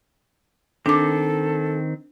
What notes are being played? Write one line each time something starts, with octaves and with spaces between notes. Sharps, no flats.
D#3 C4 D4 A4 D6